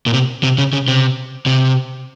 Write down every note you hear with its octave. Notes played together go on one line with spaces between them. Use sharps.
A#2
C3
C3
C#3
C#3
C3
C3